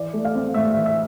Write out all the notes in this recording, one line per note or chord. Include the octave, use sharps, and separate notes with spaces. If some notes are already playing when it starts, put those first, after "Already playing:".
Already playing: E3 D5
A3
F5
C4
A2 E5
E3 E5
E5